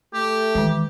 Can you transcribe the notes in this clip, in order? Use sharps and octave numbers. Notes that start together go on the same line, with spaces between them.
A3 G4
D#3 E3 G#3